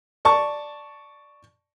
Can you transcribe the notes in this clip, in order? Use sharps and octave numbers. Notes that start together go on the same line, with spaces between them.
D5 A5 C#6